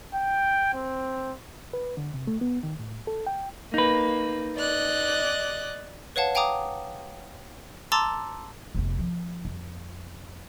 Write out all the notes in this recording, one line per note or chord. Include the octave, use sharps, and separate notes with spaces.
G5
C4
B4
D3
C3
A3
B3
D#3
A2
A4
G5
A#3 D#4 B4
D5 D#5 F#6
B4 C#5 F5 F#5 A5
F5 G5 G#5 A#5 D6 D#6
A5 A#5 C6 D6 E6 A6
F1 B3
F3
F2